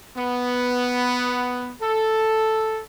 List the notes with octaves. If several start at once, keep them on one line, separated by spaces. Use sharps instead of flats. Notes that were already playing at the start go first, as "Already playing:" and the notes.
B3
A4